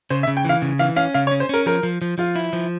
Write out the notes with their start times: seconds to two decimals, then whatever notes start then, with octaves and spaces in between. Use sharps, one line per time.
0.10 C#3 C5
0.23 E5
0.27 C#3
0.37 G5
0.45 E3 F5
0.62 C#3
0.79 E3 F5
0.96 C#4 F5
1.14 C#3 F5
1.27 C#5
1.31 C#4
1.40 C5
1.49 C#4 A#4
1.66 F3 A#4
1.83 F3
2.02 F3
2.18 F3 F4
2.36 E4
2.53 F3